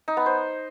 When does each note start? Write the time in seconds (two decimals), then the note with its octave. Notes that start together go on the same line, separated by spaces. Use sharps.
0.08 D#4
0.17 B3
0.26 C5